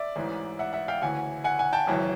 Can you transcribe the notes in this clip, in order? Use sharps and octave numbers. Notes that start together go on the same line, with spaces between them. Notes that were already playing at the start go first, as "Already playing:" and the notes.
Already playing: D5 E5
A1 G#2 E3
E5 F#5
E5 F#5
F5 G5
D2 C#3 E3 F#5 G#5
F#5 G#5
F#5 G#5
G5 A5
G#1 F#2 C#3 E3